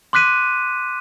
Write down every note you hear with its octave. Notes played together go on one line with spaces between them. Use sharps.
C6 D6 F#6 B6 D#7